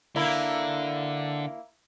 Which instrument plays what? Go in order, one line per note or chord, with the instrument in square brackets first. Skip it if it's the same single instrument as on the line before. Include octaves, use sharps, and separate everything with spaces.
[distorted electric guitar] D3 [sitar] A#3 E4